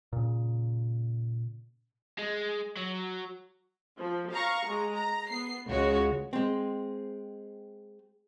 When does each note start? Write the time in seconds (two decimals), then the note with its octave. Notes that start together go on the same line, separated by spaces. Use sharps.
0.13 A#2 C#3
2.19 G#3
2.77 F#3
3.98 F3
4.32 F5 A#5 C#6
4.65 G#3 A#5
4.95 A#5
5.30 B3 C7
5.68 C#2 C#3 G#3 F#4 C#5
6.33 G#3 C4